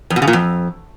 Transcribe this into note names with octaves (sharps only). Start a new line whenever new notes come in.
F2
B2
C#3
A#2
F2